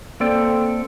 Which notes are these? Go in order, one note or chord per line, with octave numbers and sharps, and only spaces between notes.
A#3 C4 A4 D5 G5